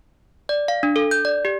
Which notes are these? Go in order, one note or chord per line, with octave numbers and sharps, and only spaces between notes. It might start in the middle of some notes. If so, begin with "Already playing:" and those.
D5
F5
D4
A4
G6
D5
G4